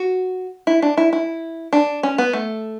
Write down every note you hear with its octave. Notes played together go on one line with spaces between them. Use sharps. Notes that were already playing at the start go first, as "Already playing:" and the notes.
Already playing: F#4
E4
D4
E4
E4
D4
C#4
B3
A3